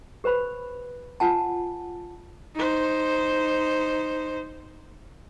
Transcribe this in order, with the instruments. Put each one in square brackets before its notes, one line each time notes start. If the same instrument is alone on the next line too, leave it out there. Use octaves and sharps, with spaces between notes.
[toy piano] G4 B4 C5 B5
F4 F#5 G#5 A5
[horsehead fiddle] D#4 C5